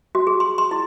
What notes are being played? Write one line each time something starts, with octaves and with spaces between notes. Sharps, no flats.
F#4
G#4
C6
C6
E4